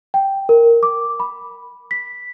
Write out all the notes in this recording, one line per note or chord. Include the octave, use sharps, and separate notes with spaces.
G5
A#4
D6
B5
B6